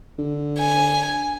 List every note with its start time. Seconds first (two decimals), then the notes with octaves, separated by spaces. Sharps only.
0.19 D3
0.59 G#5